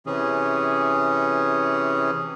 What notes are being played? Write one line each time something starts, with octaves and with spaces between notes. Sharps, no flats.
C3 E3 C#4 G#4